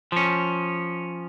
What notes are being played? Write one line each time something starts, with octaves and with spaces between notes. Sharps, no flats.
F3 C#4